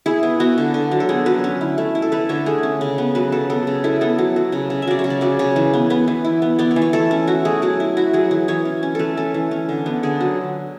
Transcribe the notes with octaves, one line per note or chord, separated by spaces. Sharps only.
E4 G#4
B3
B3 F#4
D3
D3
F#3
A4
B3 G#4
F#3 B4
C#4
E4
A3
E4
A4
A3 B4
D3 C#5
A3 G#4
C#4
C#3
B3
F#3 B4
F#3 A4
B3 A4
C#3
E4 A4
B3 A4
F#3
F#3
C#3
C#3
E5
F#3 D5
C#5
C#3
D5
F#3 D5
C#3 C#5
E3
B3
B3 B4
E3
E4
B3
B3 D5
C#5
E3
C#5
A3 A4
C#4
E4 F#4
A3 G#4
F#3 G#4
E4
E4 F#4
F#3 G#4
E3 G#4
E3 C#5
C#4
C#4
A3 A4 B4
C#4 A4
E3
C#4
D3
B3
D3 G#4
F#3